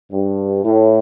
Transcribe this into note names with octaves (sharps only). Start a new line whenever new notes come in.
G2
A2